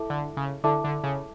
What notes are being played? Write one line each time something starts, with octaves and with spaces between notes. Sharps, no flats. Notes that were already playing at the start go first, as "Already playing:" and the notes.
Already playing: E4 A4 E5 A5 D6
D3
C#3
D3 E4 A4 E5 A5 D6
D3
C#3